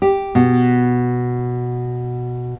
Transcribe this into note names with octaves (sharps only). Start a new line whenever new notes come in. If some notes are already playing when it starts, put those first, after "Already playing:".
G4
B2